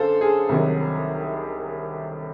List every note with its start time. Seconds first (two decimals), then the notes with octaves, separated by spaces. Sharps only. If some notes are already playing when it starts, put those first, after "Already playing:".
Already playing: F#2 D3 A4 C5 F5
0.21 G#4
0.49 C2 C3 D#3 F#3